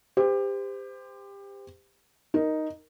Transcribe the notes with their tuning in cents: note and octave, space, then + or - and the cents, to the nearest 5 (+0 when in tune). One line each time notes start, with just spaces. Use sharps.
G4 +25 C5 -30
D#4 +0 A#4 +0